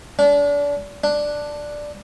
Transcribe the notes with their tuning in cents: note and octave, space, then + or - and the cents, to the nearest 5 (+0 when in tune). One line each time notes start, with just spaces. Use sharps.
D4 -30
D4 +5